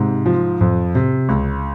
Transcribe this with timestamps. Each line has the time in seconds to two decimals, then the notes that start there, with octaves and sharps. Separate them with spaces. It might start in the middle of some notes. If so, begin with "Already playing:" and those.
Already playing: G#2 C3
0.26 F3
0.61 F2
0.95 C3
1.29 C#2